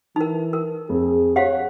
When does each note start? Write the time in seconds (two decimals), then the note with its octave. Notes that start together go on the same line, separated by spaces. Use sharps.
0.16 E3 D#4 A#4
0.53 A#4
0.89 F2 G#4
1.36 G4 C5 C#5 F5 F#5